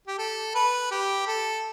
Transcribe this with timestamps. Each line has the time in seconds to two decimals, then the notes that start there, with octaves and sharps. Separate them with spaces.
0.07 G4
0.18 A4
0.55 B4
0.91 G4
1.27 A4